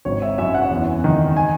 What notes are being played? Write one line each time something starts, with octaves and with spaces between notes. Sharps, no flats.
G#1 C#5
E5
F#2 E5
F#5
E2
D#3
G#5